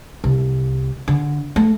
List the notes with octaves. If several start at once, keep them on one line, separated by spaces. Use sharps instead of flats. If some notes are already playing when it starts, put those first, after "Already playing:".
C2
D3
A3